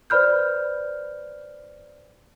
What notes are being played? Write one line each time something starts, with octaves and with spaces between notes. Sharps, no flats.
B4 C5 D5 B5 F6 G6